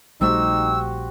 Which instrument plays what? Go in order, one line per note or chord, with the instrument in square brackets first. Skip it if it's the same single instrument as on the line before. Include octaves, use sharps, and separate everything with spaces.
[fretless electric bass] A#1 G3 A3 [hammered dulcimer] C4 F#4 G4 [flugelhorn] D#4 [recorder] E6